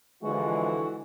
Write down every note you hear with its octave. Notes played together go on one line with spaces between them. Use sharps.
D3 E3 F3 G#3 F#4